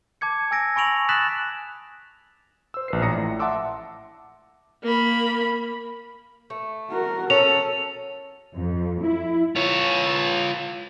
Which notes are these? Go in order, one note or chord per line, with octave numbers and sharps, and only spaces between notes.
A5 D6 G#6 C#7
G#5 E6 G#6 A#6 D7
G#5 B5 C#6 D7 F7 F#7
D#6 F#6 A6 B6 E7 F#7
C5 E6
A#1 B4 C7
A1 D5 A#5 D#6 A#6 C#7
A2
E5 F#5 A5 C6 D6 E6
A#3 B5
A3
F#4 A#4
C#4 A4 F7
F2
E4
F4 C#5